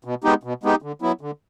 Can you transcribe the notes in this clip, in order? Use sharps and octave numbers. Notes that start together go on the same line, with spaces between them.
B2
G#3 B3 D#4 G4
B2
G#3 B3 D#4 G4
D3
F#3 B3 E4
D3